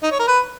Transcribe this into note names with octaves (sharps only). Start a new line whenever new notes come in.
D#4
C#5
A#4
B4